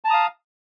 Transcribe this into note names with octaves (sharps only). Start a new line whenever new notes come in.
F5 A5 A#5 D#6